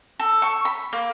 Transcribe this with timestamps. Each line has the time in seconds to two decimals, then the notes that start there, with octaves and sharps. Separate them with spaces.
0.20 A4
0.42 C#6
0.65 B5
0.93 A#3